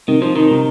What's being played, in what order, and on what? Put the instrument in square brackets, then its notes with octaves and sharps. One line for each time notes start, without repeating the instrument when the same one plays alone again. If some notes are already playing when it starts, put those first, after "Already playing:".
[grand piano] C3 [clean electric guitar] D#3
[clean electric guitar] F3
D#3
[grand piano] C3